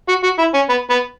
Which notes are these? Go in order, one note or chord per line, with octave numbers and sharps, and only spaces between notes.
F#4
F#4
E4
C#4
B3
B3